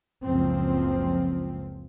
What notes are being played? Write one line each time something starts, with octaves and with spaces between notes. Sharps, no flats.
F#1 C#2 F3 C4